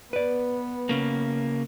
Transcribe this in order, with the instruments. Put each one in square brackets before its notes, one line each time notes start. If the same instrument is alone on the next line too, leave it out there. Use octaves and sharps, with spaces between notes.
[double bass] B3 [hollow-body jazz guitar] B4 D5
[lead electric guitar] C#3 A#3